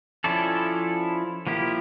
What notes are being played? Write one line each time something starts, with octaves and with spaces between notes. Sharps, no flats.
F3 C#4 E4 A4 D5
F3 A#3 E4 G4